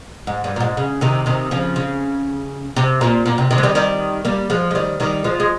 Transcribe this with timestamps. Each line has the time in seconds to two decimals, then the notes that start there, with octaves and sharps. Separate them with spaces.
0.27 G#2
0.44 G2
0.56 A#2
0.60 G#2
0.77 C#3
1.01 C3 D#3
1.26 C3 D#3
1.51 C#3 F3
1.76 C#3
2.76 C3
3.01 A#2
3.26 A#2
3.38 C3
3.51 C3 D#3
3.58 G#3
3.63 D#3 G3
3.75 D#3 G3
4.25 G3 A#3
4.50 F3 G#3
4.71 G#3
4.75 D#3 G3
5.00 D#3 G3
5.24 F3 G#3
5.40 G#3